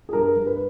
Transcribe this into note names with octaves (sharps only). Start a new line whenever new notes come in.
G#4
G2 A#4
G2
B4